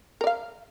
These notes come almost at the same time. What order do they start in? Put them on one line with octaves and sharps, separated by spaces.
A#4 D5 F5